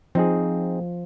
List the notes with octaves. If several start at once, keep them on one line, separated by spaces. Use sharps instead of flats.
F3 C4 D#4 G#4